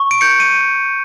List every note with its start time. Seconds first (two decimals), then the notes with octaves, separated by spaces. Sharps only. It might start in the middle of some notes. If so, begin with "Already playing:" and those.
Already playing: C#6
0.11 D7
0.21 G6 C#7
0.40 D#7